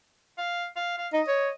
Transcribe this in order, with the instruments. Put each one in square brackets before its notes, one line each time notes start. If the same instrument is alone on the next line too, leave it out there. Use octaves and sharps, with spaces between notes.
[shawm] F5
F5
F5
[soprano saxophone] D#4 [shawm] D#5
[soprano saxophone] C#5